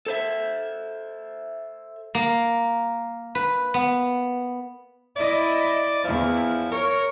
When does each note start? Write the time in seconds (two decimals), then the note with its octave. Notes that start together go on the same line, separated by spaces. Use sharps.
0.06 A4 C5 E5
2.15 A#3
3.35 B4
3.74 B3
5.16 E4 D5 D#5
6.04 E2 F3 E4
6.72 A#4 C#5